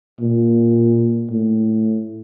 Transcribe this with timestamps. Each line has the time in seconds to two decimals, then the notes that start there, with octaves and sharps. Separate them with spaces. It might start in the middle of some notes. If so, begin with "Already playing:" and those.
0.20 A#2
1.30 A2